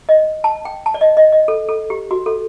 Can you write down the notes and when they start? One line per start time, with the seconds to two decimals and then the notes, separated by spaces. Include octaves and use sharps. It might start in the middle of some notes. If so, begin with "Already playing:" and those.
0.09 D#5
0.44 A5
0.65 G5
0.86 A5
0.94 D5
1.01 D#5
1.17 D#5
1.32 D#5
1.48 A4
1.68 A4
1.90 G4
2.11 F#4
2.26 A4